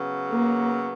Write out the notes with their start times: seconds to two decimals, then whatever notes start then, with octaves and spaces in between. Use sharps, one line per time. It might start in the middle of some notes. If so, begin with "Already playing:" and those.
Already playing: C#3 F#3 B3
0.28 A#3